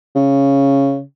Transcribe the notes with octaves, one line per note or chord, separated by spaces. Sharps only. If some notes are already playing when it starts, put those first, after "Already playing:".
C#3